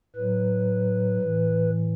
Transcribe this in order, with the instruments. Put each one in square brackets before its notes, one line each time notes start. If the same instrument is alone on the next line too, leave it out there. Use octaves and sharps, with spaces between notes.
[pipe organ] A2 F#3 B4
A2 E3